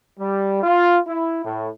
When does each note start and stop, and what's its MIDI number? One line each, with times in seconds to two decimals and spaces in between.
0.19 0.60 55
0.63 0.98 65
1.08 1.42 64
1.44 1.68 45